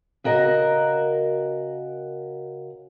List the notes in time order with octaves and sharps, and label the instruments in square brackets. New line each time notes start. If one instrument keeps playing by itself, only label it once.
[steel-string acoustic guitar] C#3 F#4 A#4 D#5